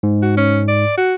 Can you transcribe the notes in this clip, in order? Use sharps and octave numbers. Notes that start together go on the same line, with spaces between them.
G#2
F#4
C#4
D5
F#4